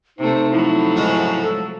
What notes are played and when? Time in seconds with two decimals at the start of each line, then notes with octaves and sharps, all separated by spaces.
0.19 C3 A3 D#4 C5
0.51 F3 F#3 A3 E4
0.97 G#2 C#3
1.42 A4